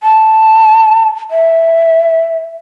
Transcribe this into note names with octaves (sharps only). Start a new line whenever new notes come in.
A5
E5